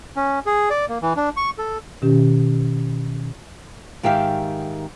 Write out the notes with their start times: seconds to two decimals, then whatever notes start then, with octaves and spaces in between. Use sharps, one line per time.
0.16 C#4
0.46 G#4
0.70 D5
0.89 A#3
1.02 E3
1.16 D4
1.37 C#6
1.58 A4
2.02 B2 D#3 C#4 G4
4.03 G#2 D#3 G4 E5 F5 G5